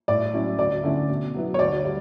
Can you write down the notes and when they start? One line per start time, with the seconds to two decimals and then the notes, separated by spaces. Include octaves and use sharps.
0.08 A2 D5
0.34 F#3 C#4 E4
0.58 D2 D5
0.83 D3 A3 C#4 E4
1.09 B2
1.35 F#3 B3 E4
1.54 C#5
1.59 D2 D5
1.85 D3 G3